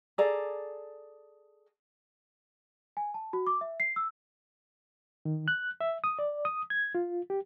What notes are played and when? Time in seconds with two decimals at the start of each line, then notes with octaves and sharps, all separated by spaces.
0.18 G#4 A4 D5 A#5
2.97 G#5
3.14 A5
3.33 F#4
3.47 D6
3.61 E5
3.80 C7
3.96 E6
5.25 D#3
5.48 F#6
5.81 E5
6.04 D#6
6.19 D5
6.45 D#6
6.70 G#6
6.95 F4
7.30 G4